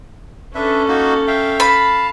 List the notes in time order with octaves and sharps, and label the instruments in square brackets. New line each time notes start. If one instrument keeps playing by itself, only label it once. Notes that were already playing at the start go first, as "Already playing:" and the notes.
[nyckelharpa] C#4 A4 [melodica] D4 B4 E5
[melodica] A#3 D#4 F#4
E5 F5 G5
[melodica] F5 A5 [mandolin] B5